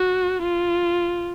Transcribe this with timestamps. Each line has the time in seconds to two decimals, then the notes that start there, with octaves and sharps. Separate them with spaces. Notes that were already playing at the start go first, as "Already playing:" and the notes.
Already playing: F#4
0.43 F4